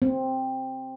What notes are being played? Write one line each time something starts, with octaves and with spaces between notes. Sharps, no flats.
C4